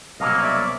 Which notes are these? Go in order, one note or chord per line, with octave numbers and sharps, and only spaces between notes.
C2 B2 F#3 A#3 C#4 D#5 F5
D5 E5